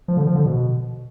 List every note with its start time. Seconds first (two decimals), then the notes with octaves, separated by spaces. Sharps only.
0.08 F3
0.17 D3
0.27 F3
0.35 D3
0.46 B2